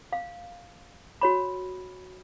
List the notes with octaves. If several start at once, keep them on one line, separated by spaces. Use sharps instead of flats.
F5
F#4 C#5 B5